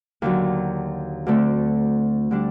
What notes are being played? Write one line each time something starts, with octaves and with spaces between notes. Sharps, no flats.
D#2 D3 F#3
D2 D3 A3 C4
D3 G3 D4